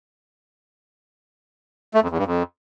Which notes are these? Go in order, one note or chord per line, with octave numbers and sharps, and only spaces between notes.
A3
F2
E2
G2
F2